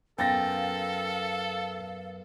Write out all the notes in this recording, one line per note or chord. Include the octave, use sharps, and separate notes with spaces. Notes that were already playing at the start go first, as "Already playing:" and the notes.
F#2 B3 A4 F5 G5 A6 A#6